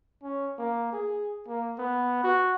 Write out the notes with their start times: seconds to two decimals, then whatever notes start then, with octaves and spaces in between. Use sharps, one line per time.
0.23 C#4
0.59 A#3
0.93 G#4
1.48 A#3
1.78 B3
2.24 F#4